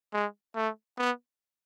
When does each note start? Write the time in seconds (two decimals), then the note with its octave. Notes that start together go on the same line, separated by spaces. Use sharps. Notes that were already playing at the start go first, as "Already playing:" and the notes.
0.13 G#3
0.56 A3
0.98 B3